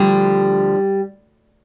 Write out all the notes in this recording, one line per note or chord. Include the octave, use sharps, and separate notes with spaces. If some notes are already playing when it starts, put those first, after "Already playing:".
Already playing: D2 D3 F3 G3